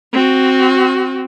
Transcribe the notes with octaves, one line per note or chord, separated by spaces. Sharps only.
C4 F#4